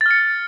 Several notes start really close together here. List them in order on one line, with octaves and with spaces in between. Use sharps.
A6 F6 C#7